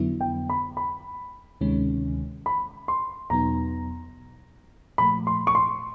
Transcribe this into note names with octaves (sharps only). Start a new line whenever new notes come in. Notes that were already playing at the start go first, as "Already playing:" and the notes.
Already playing: F2 D3 F#3 B3 E4
G5
B5
B5
D2 C3 D#3 G#3 C#4
B5
C6
E2 B2 F#3 B3 D#4 A#5
A#2 F3 A3 B5
C6
C#6
C6